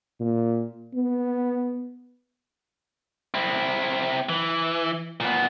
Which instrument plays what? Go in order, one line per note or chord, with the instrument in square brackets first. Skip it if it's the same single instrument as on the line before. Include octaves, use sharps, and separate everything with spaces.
[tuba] A#2
B3
[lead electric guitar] C4 E4
E3
A#2 B3